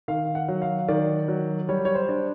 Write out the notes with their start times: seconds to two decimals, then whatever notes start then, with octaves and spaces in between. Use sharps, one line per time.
0.08 D#3 F5
0.35 F#5
0.48 F#3
0.62 F5
0.88 D#3 D5
1.28 F#3
1.69 G3 C#5
1.85 C#5
1.95 C5
2.09 D4